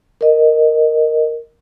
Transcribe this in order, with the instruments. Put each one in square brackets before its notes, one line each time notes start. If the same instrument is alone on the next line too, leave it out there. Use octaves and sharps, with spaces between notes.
[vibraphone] A#4 D#5